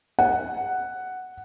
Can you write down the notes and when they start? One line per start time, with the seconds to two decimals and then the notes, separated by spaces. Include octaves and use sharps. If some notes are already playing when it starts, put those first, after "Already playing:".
0.19 F#5